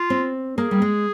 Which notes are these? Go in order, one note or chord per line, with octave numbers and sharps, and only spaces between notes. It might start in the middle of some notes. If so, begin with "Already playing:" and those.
Already playing: F4
C4
A#3 G#4
G3
G#3